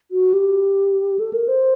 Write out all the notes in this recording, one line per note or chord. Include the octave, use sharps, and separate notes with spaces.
F#4
G4
A4
A#4
C5